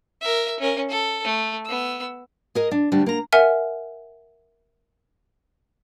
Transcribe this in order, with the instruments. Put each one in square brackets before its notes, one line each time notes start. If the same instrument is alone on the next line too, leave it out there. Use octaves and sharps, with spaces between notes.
[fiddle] A#4 E5
C#4 A#4
A4
A3
B3 E6
[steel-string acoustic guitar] G#4 A#4 D#5
D4
D2 G3 D4
A#3 A#5
[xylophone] A#4 E5 F#5 G#5 F6